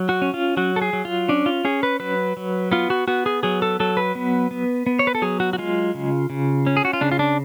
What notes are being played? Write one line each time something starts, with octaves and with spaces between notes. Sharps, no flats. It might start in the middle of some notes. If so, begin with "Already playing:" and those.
Already playing: F#3
F#4
C#4
F4
F#3 F#4
A4
G#4
F#3
F4
C#4 D4
F4
C#4 G#4
B4
F#3 B4
F#3
B3 F4
F#4
B3 F#4
G#4
F#3 G#4
A4
F#3 A4
B4
B3
B3
B3
C#5
B4
A4
F#3 G#4
F#4
F#4
G#3 F4
C#3
C#3
C#4
G#4
F#4
F4
C#3 D4
F4
D4